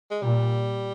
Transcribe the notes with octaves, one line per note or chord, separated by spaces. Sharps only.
G#3
A#2 G3